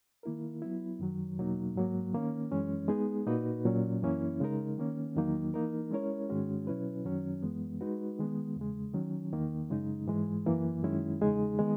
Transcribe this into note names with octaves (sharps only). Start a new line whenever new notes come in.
D#3 A#3 E4 A#4
F#3 B3 E4
F#2 D#3 F#3
E2 B2 F#3 A#3 D#4
G#2 F#3 A#3
D#3 A#3 C#4
F#2 E3 G#3 C#4
G#3 B3 D#4 G#4
A#2 A#3 D#4 F#4 B4
A#2 F#3 C#4
F#2 E3 A#3 C#4 E4
C#3 G#3 D#4 A#4
D#3 A#3 C#4
E2 D#3 F#3 A#3 D#4
E3 A#3 D#4 A#4
G#3 C#4 E4 A#4 C#5
G#2 D#3 G#3 C#4 F#4
B2 F#3 C#4 E4 B4
F#2 D#3 F#3 C#4
F#2 E3 G#3 B3
G#3 D#4 F#4 B4
D#3 G#3 B3
E2 C#3 G#3
D#3 F#3 C#4
E2 D#3 A#3
F#2 C#3 G#3 D#4
G#2 E3 G#3
F#2 E3 A#3
F#2 D#3 G#3 C#4 E4
E2 C#3 G#3 D#4 G#4
D#3 G#3 B3